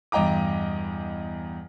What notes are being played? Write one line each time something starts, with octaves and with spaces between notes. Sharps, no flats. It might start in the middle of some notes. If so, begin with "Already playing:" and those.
E2 G2 D#5 G5 A#5 D6